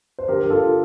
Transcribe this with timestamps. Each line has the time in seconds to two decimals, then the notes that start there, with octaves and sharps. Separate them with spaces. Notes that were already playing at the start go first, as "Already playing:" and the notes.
0.19 C5
0.28 D3 G4 A#4
0.41 D3 G4
0.50 F4 A4